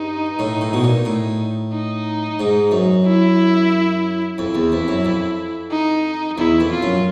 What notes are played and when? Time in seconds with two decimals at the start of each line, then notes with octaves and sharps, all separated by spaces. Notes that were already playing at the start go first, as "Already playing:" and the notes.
Already playing: G2 D#4
0.39 A2
0.61 A2
0.73 B2
0.84 A#2
1.05 A2
1.73 D#4
2.40 G#2
2.72 F#2
3.06 E4
4.38 F2 E4
4.55 E2
4.72 F2
4.88 F#2
5.05 F2
5.71 D#4
6.38 E2 E4
6.60 F2
6.71 F4
6.83 F#2